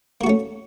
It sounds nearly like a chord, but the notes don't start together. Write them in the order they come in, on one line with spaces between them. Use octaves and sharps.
A#3 F#4 A3 C#4